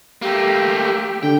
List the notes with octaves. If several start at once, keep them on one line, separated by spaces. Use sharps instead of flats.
A3 A#3 G4
D3 G5